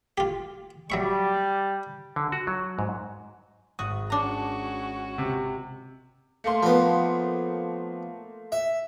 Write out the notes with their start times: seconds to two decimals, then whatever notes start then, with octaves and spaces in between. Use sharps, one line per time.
0.18 F4 G4
0.90 F#3 G3 E5 C#6
2.16 D3
2.32 F#4
2.47 F#3
2.79 G#2
3.79 G#1 F#4 D#6
4.10 C#4 D4 F#4 A#5
5.18 C3
6.44 A3 A#3 C6
6.63 F3 B3
8.52 E5